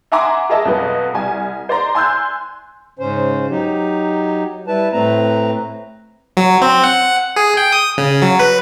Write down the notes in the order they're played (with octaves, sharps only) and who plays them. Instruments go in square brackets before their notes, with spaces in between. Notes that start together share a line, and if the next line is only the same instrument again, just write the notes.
[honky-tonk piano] E5 F#5 G#5 A#5 C6 D6
G#4 A#4 D#5 E5 A5
F2 B2 F#3 B4 D#5
C2 G#5
C5 D5 A#5 C6
G#5 C6 E6 F#6 G6
[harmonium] G#2 C#3 C#4 C5
F#3 D#4 G4
G3 E4 B4 A5
A2 A3 C4 B4 A#5
[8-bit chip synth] F#3
C4
F#5
G#4
G5
D#6
C#3
F#3
B4